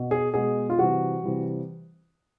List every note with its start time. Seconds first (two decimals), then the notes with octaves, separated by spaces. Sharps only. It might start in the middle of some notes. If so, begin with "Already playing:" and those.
Already playing: B2
0.11 G#4
0.34 B2 G#3 G#4
0.70 F4
0.78 C3 E3 G3 F#4
1.24 C3 E3 G3